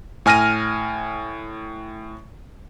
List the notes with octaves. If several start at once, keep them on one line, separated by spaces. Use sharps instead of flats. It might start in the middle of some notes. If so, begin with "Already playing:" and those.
A2 G#5 F6 A#6 D#7